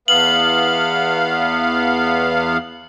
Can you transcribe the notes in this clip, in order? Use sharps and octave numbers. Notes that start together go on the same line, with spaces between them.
E2 B3 F5 F#7